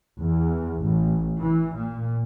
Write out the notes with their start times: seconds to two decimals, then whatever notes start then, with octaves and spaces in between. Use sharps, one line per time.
0.18 E2
0.82 A1
1.41 E3
1.77 A#2